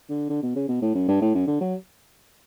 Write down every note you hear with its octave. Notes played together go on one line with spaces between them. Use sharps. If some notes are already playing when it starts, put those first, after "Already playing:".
D3
D3
B2
C#3
B2
A2
F#2
G2
A2
F#2
D3
F#3